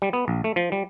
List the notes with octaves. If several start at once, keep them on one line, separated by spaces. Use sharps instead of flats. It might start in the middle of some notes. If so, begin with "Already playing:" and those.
G3
B3
A#1
A3
F3
G3